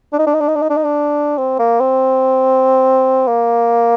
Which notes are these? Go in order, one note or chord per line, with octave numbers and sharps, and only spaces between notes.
D4
D#4
D4
D#4
D4
D#4
D4
D#4
D4
D#4
D4
C4
A#3
C4
A#3